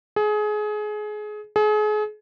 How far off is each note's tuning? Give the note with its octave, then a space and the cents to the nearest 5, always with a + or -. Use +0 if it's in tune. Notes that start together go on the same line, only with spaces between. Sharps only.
G#4 +25
G#4 +35